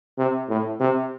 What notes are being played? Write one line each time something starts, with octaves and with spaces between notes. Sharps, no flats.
C3
A2
C3